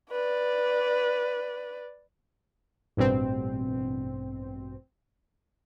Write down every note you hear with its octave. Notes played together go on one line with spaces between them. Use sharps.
B4 D5
A1 G2 B2 C4